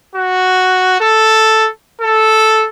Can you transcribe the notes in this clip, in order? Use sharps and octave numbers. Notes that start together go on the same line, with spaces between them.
F#4
A4
A4